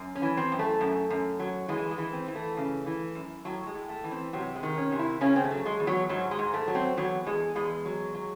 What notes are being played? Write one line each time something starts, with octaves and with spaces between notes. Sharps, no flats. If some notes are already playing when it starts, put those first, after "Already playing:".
Already playing: F#2
C#4
E3
C4
F#2
A3
F#2
F#2
F#3
E3 G#3
G#3
E3
C4
E3
A3
C#3
E3
F#2
A2 F#3
G#3
A2
A3
E3
C4
C3 F#3
G#3
D#3
C#4
C3
E4
C#3 C#4
C4
A3
F#3
G#3
E2
F#3
G#2 F#3
G#3
G#2
A3
F#3
C4
E2 F#3
E2 G#3
E2 G#3
F#3
F#3